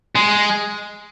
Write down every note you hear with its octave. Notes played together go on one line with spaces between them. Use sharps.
G#3